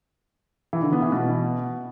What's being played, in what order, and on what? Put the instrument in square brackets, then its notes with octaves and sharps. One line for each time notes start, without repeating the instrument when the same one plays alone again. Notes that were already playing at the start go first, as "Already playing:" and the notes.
[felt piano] E3
D3
B3
E3
B2